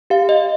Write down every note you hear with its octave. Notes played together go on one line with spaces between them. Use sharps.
G4 F5
D#5